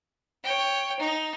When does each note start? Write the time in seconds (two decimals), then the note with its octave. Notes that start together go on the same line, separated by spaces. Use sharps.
0.44 C#5 G5
0.99 D#4